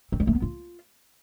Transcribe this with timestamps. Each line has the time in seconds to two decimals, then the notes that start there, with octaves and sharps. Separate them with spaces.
0.12 C4
0.20 G3
0.27 A3
0.35 B3
0.42 F4